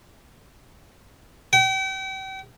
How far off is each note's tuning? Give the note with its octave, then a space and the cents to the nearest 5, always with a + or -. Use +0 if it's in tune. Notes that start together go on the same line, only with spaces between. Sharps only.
G5 -40